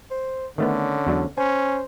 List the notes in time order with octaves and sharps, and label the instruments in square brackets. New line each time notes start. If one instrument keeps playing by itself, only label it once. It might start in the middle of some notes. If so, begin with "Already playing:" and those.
[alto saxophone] C5
[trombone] D3 [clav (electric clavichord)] D#3 A3 B3 [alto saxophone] C#4
[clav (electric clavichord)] E2 F#3 D4
[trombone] C#4 [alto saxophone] C5 [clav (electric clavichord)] G#5